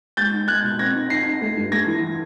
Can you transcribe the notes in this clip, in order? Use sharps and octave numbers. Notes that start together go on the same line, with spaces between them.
G#3 G6 A6
D#4
G#3 F#6 G#6
B2
C4 G#6 A#6
D#4
D#4 A#6 C7
D#4
A3
G2
A3 G#6 A#6
E3